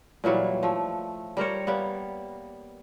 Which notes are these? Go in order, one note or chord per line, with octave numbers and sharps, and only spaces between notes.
A#2 E3 F#3 G3
F3 A3
G3 A#4 C5 C#5
G3 A#3 B3